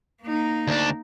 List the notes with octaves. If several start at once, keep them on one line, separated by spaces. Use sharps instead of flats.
A#3 D#4
D2 D4